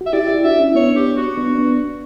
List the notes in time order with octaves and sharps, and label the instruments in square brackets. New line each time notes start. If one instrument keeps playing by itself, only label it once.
[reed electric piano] F#4
[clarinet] E5
[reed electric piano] E4 G4 [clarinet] D5
[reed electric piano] E4 G4
[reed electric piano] D4 F#4 [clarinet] E5
[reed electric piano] C#4 E4
[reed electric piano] B3 D4 [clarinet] C#5
[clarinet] G4
F#4
[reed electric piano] B3 D4
B3 D4